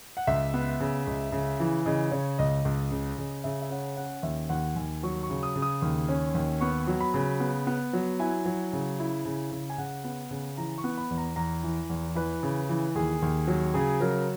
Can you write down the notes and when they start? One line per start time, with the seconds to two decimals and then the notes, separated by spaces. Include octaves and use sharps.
0.17 F#5
0.27 C#2 E5
0.54 B3
0.80 C#3
1.07 C#2
1.32 C#3
1.60 E3
1.86 C#3 D#5
2.11 C#3 C#5
2.39 C#2 D#5
2.65 C#2
2.91 C#3
3.18 C#3
3.44 C#3 E5
3.62 E5
3.70 C#4 F#5
3.97 C#4 F#5
4.23 D#2 E5
4.49 D#2 F#5
4.76 D#2 G#5
5.03 F#3 C#6
5.23 C#6
5.30 C#3
5.43 D#6
5.56 C#3
5.62 D#6
5.82 D#2
6.09 C#4
6.35 D#2
6.61 B3 C#6
6.87 F#3
7.01 B5
7.14 C#3
7.40 B3
7.67 B3
7.93 F#3
8.19 E4 G#5
8.46 F#3
8.73 C#3
9.00 E4
9.25 C#3
9.52 C#3
9.70 G#5
9.78 C#3 F#5
10.04 B3
10.31 C#3
10.57 E3 A#5
10.78 C#6
10.84 B3
10.98 B5
11.10 E2
11.17 A#5
11.36 E2 A#5
11.63 E3
11.90 E2
12.15 E3 B4
12.43 C#3
12.69 E3
12.95 D#2 G#4
13.22 D#2
13.48 F#3
13.74 C#3 G#4
14.01 F#3 A#4